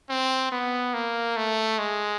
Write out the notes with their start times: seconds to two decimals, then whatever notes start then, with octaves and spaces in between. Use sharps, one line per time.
0.09 C4
0.52 B3
0.94 A#3
1.36 A3
1.79 G#3